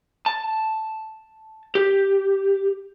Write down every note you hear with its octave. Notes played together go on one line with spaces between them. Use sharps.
A5
G4